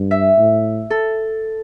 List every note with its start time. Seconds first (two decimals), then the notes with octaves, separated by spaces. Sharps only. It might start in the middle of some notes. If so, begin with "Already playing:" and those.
Already playing: G2
0.11 E5
0.38 A2
0.90 A4